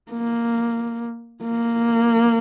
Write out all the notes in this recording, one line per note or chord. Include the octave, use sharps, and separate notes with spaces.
A#3
A#3